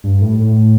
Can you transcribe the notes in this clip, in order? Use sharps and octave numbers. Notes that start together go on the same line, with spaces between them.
G2
A2
A2